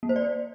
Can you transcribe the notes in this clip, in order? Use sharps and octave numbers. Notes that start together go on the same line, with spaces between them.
A#3
C5
D5